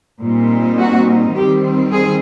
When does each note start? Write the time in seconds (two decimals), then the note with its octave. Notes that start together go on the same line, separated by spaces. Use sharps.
0.22 A#2 G3 C4 D#4
0.79 F#4
1.35 D#3 G3 C4 G4
1.91 G#4